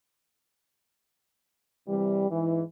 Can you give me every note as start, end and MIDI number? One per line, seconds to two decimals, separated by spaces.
1.88 2.29 48
1.88 2.29 52
1.88 2.29 55
2.30 2.61 44
2.30 2.61 52